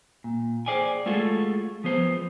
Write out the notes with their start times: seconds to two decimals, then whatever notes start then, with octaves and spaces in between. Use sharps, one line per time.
0.24 A#2
0.66 G#4 A#4 C5 D5 G5 G#5
1.06 G#3 A3 F4 F#4 G#4 A4
1.84 F3 B3 G#4 C5